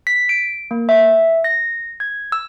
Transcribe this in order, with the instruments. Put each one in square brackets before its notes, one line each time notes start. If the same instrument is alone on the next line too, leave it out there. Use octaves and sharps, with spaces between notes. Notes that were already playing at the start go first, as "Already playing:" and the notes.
[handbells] B6
D7
A#3
E5
A#6
G#6
E6